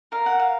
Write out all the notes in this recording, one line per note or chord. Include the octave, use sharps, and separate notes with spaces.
A#4 F5
F#5
F5